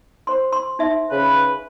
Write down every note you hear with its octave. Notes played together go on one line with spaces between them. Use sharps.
C5 C6
C6
D#4 E5 C6
C#3 B4